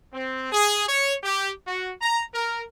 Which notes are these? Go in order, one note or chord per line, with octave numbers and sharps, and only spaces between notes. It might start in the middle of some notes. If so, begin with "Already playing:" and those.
C4
G#4
C#5
G4
F#4
A#5
A#4